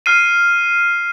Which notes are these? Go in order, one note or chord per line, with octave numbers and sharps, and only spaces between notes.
F6 C7 D#7